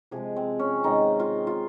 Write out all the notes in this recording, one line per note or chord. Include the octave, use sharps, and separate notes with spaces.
C3 F3 G#3 G#4
C4
C#4
C3 D#3 G#3 D#4
F4
F4